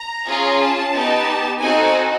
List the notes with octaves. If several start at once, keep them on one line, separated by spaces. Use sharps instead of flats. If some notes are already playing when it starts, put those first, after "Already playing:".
Already playing: A#5
C#4 F4 G#4
A5
B3 D#4 G4
C4 D#4 F#4 A4 G#5